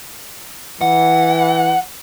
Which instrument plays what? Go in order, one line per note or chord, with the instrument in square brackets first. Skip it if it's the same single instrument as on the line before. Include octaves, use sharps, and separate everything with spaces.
[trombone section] E3 [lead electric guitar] F#5